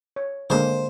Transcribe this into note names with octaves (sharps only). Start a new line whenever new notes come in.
C#5
D3 G#3 A#3 C5